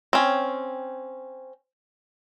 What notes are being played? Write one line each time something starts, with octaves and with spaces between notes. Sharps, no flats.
C4 C#4